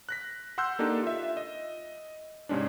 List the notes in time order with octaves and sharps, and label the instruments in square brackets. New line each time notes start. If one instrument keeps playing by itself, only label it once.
[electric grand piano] F#6 A#6 B6
F#5 C6 E6 F#6 G6
A#3 D4 D#4 G4 A4
F4 E5
D#5
G#2 C3 G#3 C#4 D4